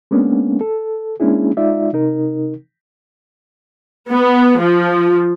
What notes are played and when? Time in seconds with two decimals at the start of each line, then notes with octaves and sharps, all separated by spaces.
0.11 G#3 A#3 B3 C#4 D4
0.61 A4
1.20 G#3 A#3 C#4 D4 E4 G#4
1.57 G#3 D#4 F4 D5 E5
1.93 C3 D#4 A#4
4.11 B3
4.61 F3